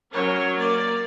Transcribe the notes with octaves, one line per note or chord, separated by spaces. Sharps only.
F#3 C#4 A#4 C#5
A#3 D5